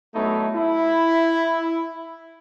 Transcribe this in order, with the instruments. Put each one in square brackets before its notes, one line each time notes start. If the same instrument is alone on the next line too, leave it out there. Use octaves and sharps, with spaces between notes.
[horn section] F#3 A3 B3 D#4 E4
E4